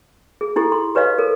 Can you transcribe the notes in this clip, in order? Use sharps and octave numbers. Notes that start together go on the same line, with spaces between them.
G#4
D#4 E4 G4 A4
C6
G4 B4 C#5 D#5 F5
A4 A#4